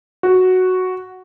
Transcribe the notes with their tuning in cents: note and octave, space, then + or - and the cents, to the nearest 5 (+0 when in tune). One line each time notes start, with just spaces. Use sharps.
F#4 +0